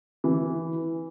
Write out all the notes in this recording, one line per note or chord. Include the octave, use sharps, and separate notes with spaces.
E3